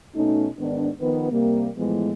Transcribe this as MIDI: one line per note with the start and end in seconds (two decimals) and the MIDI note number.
0.16 0.48 47
0.16 0.48 57
0.16 0.48 61
0.16 0.48 63
0.59 0.89 44
0.59 0.89 51
0.59 0.89 59
0.59 0.89 62
0.99 1.31 51
0.99 1.31 53
0.99 1.31 59
1.32 1.69 48
1.32 1.69 55
1.32 1.69 58
1.77 2.11 45
1.77 2.11 52
1.77 2.11 53
1.77 2.11 56
1.77 2.11 59